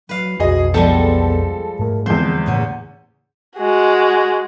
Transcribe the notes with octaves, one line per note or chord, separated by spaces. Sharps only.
F#3 B4 F5
B1 F2 F#4 G#4 D#5
F3 G3 G#3 B3 A4 A5
G#2 A3 A#4
E2 D3 F3 G#3 C4 C5 G6
A2 C#3 A#3 C#4 F#5
G#3 F#4